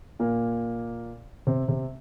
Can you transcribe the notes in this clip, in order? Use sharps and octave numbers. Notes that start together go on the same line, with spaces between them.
A#2 A#3
C3 C4
C3 C4